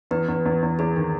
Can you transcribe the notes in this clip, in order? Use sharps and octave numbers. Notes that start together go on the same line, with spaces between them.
E2 B4
E2
E2
E2
E2 G#4
D#3